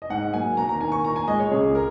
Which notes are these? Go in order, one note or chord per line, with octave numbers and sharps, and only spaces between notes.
D#5
G#2 F#5
F#3 A#3 G#5
D#2 A#5
A#5
D#3 A#3 G#5
C#6
A#2 A#5
G#5
G#3 D#5
C#5
C#2 G#4
A#4